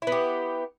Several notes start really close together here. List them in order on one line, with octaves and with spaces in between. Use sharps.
E4 B3 G4